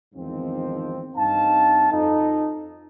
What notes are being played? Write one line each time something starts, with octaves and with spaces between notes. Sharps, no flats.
E2 G#2 D#3 F3 C4
G2 C4 D#4 F5 A5
F2 D#4 A4